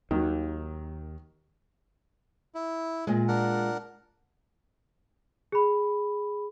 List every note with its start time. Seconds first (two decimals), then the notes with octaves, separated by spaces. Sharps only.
0.11 D#2 D#3 F#3
2.55 E4
3.07 A#2 G#3
3.28 D4 A#4 F#5
5.52 G#4 B5